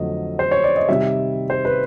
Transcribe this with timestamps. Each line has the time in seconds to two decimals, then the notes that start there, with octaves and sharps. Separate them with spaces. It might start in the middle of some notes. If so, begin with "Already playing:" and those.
Already playing: F2 D3 F#3 A3 D#5
0.39 C5
0.51 C#5
0.64 D5
0.76 D#5
0.88 C3 D#3 G3 E5
1.50 C5
1.65 B4